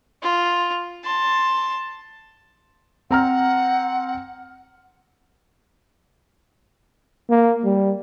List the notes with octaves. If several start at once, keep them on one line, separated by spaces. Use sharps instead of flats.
F4
A5 C6
C4 F#5 A#5 F6
A#3
G3